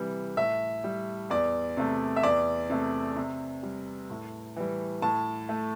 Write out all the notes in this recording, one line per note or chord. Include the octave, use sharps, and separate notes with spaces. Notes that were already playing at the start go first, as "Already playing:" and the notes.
Already playing: C3 E3 G3
A2 E5
G3
E2 D5
C3 A3
E5
E2 D5
C3 A3
C3
G3
A2
E3 G3
A2 A5
A3